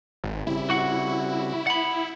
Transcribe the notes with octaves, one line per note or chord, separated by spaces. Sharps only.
G#1
C#3 G3 C4 E4
F#4 F#5
F#5 B5